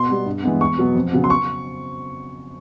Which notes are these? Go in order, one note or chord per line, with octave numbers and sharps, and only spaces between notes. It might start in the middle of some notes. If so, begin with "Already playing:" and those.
Already playing: B2 C6
G3 B3
G2
E3 G#3 B3
E2 C#6
B2 F#3 B3
F2
C#3 F#3 B3
C6
C#6